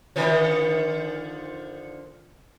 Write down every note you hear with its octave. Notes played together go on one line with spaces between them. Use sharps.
D3 D#3 F3